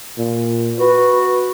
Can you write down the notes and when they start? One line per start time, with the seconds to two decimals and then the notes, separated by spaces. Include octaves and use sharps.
0.18 A#2
0.79 F#4 B4